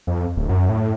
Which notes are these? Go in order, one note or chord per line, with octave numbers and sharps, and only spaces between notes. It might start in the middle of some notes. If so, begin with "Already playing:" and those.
F2
D1
F#2
A2